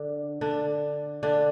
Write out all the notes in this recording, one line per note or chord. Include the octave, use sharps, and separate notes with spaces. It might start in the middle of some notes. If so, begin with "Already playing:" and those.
Already playing: D3 D4
D3 D4
D3 D4